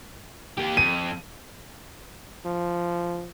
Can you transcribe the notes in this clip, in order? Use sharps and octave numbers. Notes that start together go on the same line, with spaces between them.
A#3 G4
F2 D#7
F3